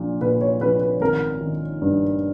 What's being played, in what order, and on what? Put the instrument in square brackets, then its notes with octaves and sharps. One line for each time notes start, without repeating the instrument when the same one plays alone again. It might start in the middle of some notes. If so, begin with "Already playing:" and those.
Already playing: [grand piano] A#1 A#2
A#2 B4
C#5
A#1 B4
B4
G#1 A#4
D#3
G2